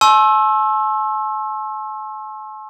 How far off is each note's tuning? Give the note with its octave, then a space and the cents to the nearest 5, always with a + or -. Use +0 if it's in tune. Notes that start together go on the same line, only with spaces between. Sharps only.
A5 -45 C6 +45 E6 +0